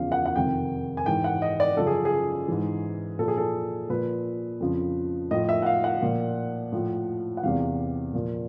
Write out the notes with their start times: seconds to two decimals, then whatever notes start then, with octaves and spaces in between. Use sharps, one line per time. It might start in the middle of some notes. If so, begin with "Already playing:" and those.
Already playing: E2 C#3 F3 F5
0.12 F#5
0.26 F#5
0.36 F2 C3 D#3 G5
0.97 G#5
1.06 G#2 E3 G5
1.24 F#5
1.42 D#5
1.60 D5
1.77 F#2 C#3 F3 A4
1.87 G#4
2.05 G#4
2.48 G#2 E3
3.19 A#2 F3 A4
3.28 G#4
3.38 A4
3.89 A#2 F3 B4
4.60 F2 C#3 F3
5.31 A2 F3 D#5
5.49 E5
5.62 F#5
5.66 F5
5.84 F#5
6.02 A#2 F3
6.72 A2 F3
7.37 F#5
7.43 E2 C3 E3 F5
8.14 A#2 F3